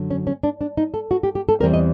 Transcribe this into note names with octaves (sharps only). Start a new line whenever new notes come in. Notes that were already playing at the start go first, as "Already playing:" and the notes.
Already playing: F#2 D3 F#3
C#4
C#4
D4
D4
D#4
A4
F#4
G4
G4
A4
E2 C3 E3 G3 C4 A#4
D#5